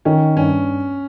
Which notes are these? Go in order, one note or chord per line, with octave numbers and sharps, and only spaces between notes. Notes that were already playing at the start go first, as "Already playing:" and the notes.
D#3 C#4
G2 C#4